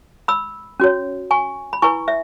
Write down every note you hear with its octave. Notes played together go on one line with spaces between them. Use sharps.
B5 E6
C#4 F#4 C#5
G#5 C#6
B5
E4 B4 G#5 C#6
E5